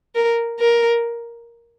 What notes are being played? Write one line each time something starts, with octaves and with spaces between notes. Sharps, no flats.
A#4
A#4